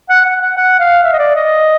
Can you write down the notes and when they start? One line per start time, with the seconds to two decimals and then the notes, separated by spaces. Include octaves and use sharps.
0.10 F#5
0.25 F#5
0.42 F#5
0.57 F#5
0.80 F5
1.04 E5
1.13 D#5
1.19 D5
1.35 D#5